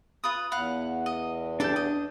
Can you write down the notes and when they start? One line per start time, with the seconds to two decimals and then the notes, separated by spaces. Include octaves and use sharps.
0.24 F4 B4 D#6
0.51 E2 F5 F#5 B5
1.06 D#5
1.60 D4 G4 A4 A5 G6
1.76 D#5